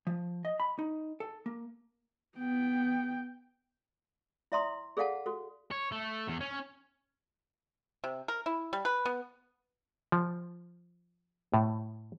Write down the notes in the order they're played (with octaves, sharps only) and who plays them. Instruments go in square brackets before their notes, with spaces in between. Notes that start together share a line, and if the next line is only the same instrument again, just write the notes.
[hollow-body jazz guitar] F3
D#5
B5
D#4
A4
A#3
[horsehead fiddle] B3 G5
[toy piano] E4 D5 E5 A#5 C6 D#6
G#4 A4 D5 F5 F#5 A5
F#4 A4
[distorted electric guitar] C#5
A3
E2
C#4
[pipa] C3
A#4
E4
G3
B4
B3
[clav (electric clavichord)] F3
A2